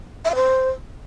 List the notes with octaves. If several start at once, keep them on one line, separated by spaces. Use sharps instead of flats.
E5
F5
C5